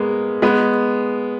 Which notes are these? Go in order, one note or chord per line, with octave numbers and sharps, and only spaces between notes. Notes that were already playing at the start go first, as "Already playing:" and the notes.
Already playing: G#3 A#3 B3
G#3 B3